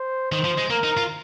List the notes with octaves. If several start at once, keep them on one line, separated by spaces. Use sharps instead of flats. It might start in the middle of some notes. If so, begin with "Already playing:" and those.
Already playing: C5
D#3 C5
F3
G#3
A#3 A#4
D#4
F4